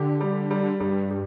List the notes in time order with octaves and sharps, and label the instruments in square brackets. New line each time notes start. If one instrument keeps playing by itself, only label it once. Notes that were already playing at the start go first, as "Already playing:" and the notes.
Already playing: [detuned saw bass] D3 [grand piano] G4
[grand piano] G3
G3
[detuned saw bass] G2 [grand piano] G3
[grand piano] G3